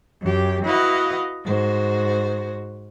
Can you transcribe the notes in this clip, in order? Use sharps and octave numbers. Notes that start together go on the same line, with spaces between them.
F#2 G4
E4 F#4 B4 D#5 F5 F#5
G#2 F#4 C5